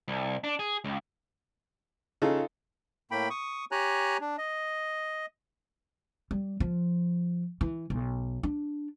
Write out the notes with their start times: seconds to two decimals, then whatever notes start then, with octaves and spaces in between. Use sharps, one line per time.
0.08 C2
0.44 D4
0.59 G#4
0.84 C#2
2.22 C#3 D#4 F4 A4
3.11 A2 A#3 G5 B5
3.30 C#6 D#6
3.72 G4 C#5 G#5 A#5 F#6
4.21 D4
4.38 D#5
6.31 G3
6.60 F3
7.61 E3
7.90 B1
8.43 D4